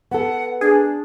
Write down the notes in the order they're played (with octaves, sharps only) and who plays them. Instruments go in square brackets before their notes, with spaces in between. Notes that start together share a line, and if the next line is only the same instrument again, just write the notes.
[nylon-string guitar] B3 A4 [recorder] F#5
[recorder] D4 [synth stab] G#4